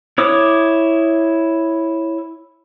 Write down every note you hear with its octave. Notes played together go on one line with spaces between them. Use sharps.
E4 C#5 D6 D#6